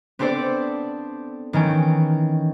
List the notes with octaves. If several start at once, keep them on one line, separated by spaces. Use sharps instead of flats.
B3 C4 D4 A4 C5 D5
D#3 E3 C#4 G5